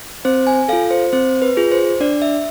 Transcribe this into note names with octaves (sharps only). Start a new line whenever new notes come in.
C4 C5
G#5
F4 A4 F5
C5
C4 C5
B4
F4 G#4
C5
D4 D5
E5